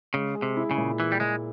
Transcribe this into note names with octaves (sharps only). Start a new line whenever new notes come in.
C#3 G#3
G#4
C3
E4
C#3
A#2
E3 G#4
G3
A#2 G#3